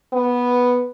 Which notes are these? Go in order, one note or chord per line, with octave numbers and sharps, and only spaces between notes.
B3